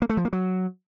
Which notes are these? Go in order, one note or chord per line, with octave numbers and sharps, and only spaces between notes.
A#3
A3
F3
A#3
F#3